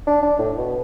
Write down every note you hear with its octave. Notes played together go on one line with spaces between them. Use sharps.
D4
D4
A2
B2